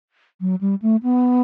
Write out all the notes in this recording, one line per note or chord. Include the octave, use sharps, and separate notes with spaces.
F#3
G3
A3
B3